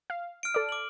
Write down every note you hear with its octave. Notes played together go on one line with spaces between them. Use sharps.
F5
F6 D7
A4 D5
D6 F#7